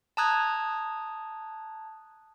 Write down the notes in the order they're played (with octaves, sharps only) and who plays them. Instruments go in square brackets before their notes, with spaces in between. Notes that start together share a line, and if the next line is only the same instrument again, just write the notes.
[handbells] A5 A#5 D#6 F#6 G#6